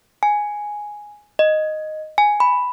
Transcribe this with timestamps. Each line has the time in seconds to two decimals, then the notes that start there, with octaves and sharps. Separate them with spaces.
0.23 G#5
1.39 D#5
2.18 G#5
2.40 B5